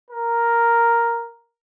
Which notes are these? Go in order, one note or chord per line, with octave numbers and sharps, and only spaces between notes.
A#4